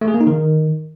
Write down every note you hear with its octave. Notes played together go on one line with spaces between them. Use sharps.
A3
G#4
A#3
D#4
D#3